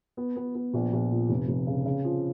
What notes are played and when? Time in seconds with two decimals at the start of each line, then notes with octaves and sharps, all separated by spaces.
0.17 B3
0.36 B3
0.55 B3
0.74 A#1
0.93 A#1
1.11 A#2
1.29 F1
1.48 F1
1.67 C#3
1.86 C#3
2.04 F3